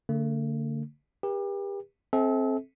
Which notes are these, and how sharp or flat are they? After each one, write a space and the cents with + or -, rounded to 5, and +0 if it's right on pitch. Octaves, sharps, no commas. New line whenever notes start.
D3 -25 A3 +45
G4 +30 B4 -45
C4 +15 A4 -35 E5 -45